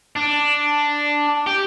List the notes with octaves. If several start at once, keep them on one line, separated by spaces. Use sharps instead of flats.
D4
G4